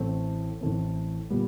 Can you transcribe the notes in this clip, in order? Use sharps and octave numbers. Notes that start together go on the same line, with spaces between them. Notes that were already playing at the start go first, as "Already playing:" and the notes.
Already playing: A1 A2 E3 A3 C4
A1 A2 E3 A3 C4
A#2 G3 B3